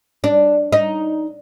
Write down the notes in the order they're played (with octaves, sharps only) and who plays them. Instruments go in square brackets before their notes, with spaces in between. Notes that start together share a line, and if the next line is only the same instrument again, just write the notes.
[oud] D4
D#4